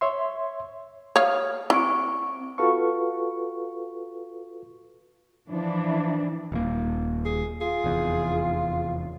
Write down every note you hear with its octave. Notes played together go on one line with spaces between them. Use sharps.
C#5 E5 C6
C#5 F5 D#6 F6
C4 E4 C#6 D7
F4 F#4 A4 B4 F5 C#6
E3 F3 D4
D#1 A#3
G#4
F4 G#4
F1 E2